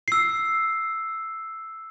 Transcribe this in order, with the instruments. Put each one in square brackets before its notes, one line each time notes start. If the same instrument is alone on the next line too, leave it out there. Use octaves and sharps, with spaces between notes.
[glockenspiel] E6 C7